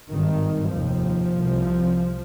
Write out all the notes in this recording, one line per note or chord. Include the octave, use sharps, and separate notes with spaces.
G#1 G2 D#3
F1 D#2 F3
C2 C3